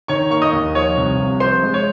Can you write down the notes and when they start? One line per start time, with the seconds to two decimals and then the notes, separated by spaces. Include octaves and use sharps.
0.08 D#3 C#5 C#6
0.30 A#3 C#6
0.42 D#5 D#6
0.53 D#2
0.75 F3 C#5 C#6
0.97 C2
1.19 C3
1.40 F3 C5 C6
1.63 G#3
1.74 C#5